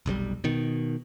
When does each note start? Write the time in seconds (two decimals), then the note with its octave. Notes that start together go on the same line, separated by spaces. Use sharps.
0.06 F1 B1 C3 G3
0.44 B2 D#3